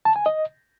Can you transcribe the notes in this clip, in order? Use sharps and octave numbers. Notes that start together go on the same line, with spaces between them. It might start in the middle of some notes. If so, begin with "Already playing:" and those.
A5
G#5
D#5